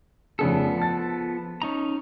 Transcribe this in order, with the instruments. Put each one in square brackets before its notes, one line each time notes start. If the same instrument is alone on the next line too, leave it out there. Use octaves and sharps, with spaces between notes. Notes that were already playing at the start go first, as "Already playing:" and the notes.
[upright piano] F1 C#3 G#4 [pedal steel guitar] F3 B3 A4
[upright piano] A5 A6
[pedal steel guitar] C#4 D#4 A#5